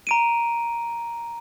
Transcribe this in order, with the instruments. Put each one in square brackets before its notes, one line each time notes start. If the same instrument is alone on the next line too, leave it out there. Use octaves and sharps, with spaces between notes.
[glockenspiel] A#5 D7 D#7